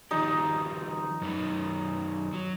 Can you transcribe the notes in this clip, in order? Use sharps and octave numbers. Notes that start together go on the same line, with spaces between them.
D#3 F3 D#4 G4
F#2 D#3 B4
F#3